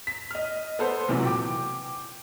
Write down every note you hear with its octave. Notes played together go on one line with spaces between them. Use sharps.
B6
D#5 F6
B3 A4 C5
A#1 C3 E3 F#3
G5 D6